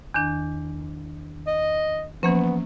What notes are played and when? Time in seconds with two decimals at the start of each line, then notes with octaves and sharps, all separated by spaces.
0.14 E2 D#3 D4
1.47 D#5
2.23 E3 F3 A#3 B3 C#4